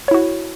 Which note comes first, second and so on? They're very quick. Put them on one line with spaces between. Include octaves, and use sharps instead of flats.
C#5 E4 F#4